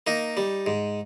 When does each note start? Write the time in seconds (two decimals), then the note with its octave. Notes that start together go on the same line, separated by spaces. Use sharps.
0.07 A#3 D#4
0.37 G3
0.66 G#2